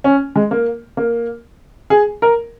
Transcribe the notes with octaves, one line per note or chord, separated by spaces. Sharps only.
C#4
G#3
A#3
A#3
G#4
A#4